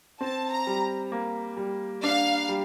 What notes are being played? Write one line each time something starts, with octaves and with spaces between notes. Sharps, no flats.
C4 A5
A#5
G3
A#3
G3
D4 F5
G3